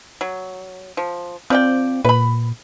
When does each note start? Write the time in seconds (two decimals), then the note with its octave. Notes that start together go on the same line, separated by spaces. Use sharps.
0.21 F#3
0.97 F3
1.50 F3 C4 D5 G5
2.05 A#2 B4 B5